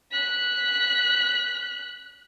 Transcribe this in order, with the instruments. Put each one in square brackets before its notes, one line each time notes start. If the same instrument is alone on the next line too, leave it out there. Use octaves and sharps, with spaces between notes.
[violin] F#6 B6